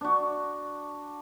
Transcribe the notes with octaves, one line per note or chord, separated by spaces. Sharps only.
D4 F#4